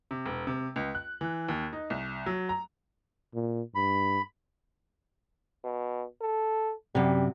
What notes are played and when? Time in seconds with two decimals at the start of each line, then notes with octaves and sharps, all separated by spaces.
0.11 C3
0.25 E1
0.47 C3
0.76 C#2
0.95 F#6
1.21 E3
1.48 D#2
1.73 D#4
1.90 C2
2.26 F#3
2.49 A#5
3.34 A#2
3.75 G2 B5
5.64 B2
6.21 A4
6.95 F#2 C3 G3